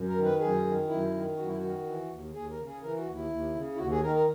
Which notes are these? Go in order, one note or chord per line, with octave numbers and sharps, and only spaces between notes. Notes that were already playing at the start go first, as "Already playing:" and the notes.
Already playing: F#2
A#4
D#3
B4
F#2 G#4
D#3
F#2 E4
D#3
F#2 F#4
E4
D#3 F#4
E3
D#2
D#2 G#4
A#4
C#3
G#4
E3 A#4
F#4
D#2
E4
D#2
C#3
E4
D#2 F#4
G#4
D#3 A#4
A#4